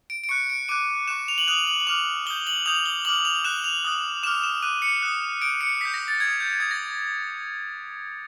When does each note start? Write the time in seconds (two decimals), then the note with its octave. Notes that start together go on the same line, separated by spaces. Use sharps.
0.10 D7
0.24 D7
0.29 C#6 F#6 C#7
0.50 D7
0.69 D6 F#6 D#7
1.08 C#6 F#6 E7
1.28 F7
1.38 F#7
1.48 D#6 F#6 F7
1.67 F#7
1.80 F#7
1.87 D6 F6 F7
2.26 D#6 G6 G7
2.47 F#7
2.66 D#6 G6 F7
2.86 G7
3.05 D6 F6 F#7
3.25 F7
3.44 D#6 F#6 E7
3.64 F7
3.85 D#6 F#6
4.23 D6 F6 E7
4.43 E7
4.62 D6 F#6 D#7
4.82 C#7
5.02 D#6 F#6
5.41 D#6 G6 D7
5.61 C#7
5.81 D#6 G6 B6
5.94 A#6
6.08 A6
6.20 D#6 G6 G#6
6.40 G6
6.60 D#6 G6 G#6
6.71 A#6